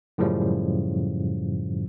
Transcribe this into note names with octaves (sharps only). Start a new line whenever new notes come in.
F#2 A2 C#3 F3 G3